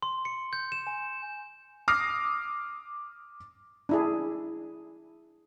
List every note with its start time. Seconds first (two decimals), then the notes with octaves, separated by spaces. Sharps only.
0.02 C6
0.25 C#7
0.53 G6
0.72 E7
0.87 G#5
1.88 D6 D#6 F6 A#6 C7
3.89 D4 E4 G#4